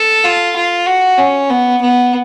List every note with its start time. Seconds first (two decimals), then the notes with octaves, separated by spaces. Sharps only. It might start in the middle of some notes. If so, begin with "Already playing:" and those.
Already playing: A4
0.24 F4
0.56 F4
0.87 F#4
1.18 C#4
1.50 B3
1.82 B3